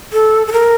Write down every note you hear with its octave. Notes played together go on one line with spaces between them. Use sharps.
A4
A4
A#4